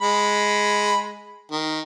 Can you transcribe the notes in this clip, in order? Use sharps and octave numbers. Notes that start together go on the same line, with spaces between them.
G#3 B5
D#3